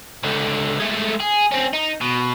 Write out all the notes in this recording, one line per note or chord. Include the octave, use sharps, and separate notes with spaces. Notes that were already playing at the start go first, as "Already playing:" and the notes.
C#2 D3
G#3 A3
G#4
C4 C#4
D#4
B2